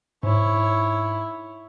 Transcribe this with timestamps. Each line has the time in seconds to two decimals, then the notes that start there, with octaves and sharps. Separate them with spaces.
0.23 G#2 E4 C#5